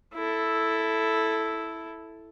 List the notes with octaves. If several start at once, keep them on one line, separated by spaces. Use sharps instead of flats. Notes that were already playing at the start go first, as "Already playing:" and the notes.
E4 A4